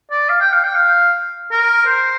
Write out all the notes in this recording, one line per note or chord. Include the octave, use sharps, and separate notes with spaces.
D5
F5
G5
F5
G5
F5
A#4
C5